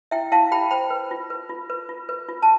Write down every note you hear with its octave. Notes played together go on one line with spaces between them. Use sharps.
E4 E5 G5
E4 F5 A5
G4 G5 B5
C5 G5 B5
B4
F4
B4
F4
B4
F4
B4
F4
A5